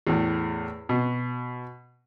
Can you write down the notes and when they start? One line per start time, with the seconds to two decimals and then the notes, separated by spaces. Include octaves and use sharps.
0.07 E2 A2
0.89 B2